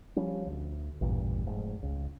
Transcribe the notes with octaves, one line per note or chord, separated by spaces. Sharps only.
F3 G3 C#4
D2
A1 E2 G2 A#2
F1 G#2
C#2